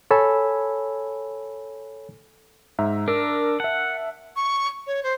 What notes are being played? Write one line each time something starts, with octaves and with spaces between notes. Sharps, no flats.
A4 C#5 G#5 B5 E6
G#2 E5 A#5
D4 A#4 E6
E5 F#5 A5
C#6
C#5
C5